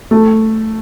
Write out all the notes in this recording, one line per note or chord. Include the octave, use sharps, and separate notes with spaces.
A3